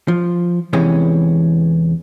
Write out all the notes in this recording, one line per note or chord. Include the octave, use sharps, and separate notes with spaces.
F3
E2 C3 E3 G#3 C#4